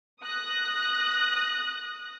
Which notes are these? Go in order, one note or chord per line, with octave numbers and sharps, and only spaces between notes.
D#6 F#6 A#6